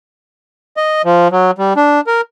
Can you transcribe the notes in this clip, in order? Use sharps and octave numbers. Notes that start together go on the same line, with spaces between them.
D#5
F3
F#3
G3
D4
A#4